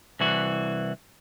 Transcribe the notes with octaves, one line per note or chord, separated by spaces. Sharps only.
C2 E3 F#4